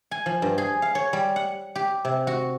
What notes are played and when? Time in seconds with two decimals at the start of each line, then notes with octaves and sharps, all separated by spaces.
0.11 G#5
0.26 F3
0.42 G2
0.58 G#4
0.82 F5
0.95 C#5
1.13 G3
1.36 F#5
1.75 G4
2.05 C3
2.27 F#4